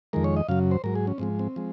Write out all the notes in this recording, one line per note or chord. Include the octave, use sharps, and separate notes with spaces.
F2 D#3 G#3 A#4
C#5
D#5
F#2 C#3 F#3 F5
C5
G#2 F#3 A#4
G#4
C#4
G#2 F3 G#3 C4
C4
F3 G#3